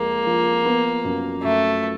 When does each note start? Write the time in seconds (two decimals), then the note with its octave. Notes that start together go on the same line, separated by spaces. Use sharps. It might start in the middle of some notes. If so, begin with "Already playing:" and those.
Already playing: F2 F3 G#3 A#3
0.26 F3
0.65 B3
1.04 F#2
1.43 F#2 A3